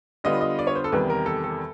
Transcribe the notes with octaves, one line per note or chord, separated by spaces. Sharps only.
D3 G3 B3 D4 F4 D#5
D#5
D5
C#5
C5
A4
E2 C3 D#3 G3 B4
A#4
A4
A4